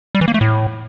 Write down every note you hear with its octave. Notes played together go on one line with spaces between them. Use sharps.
G3
E3
A#3
A3
A2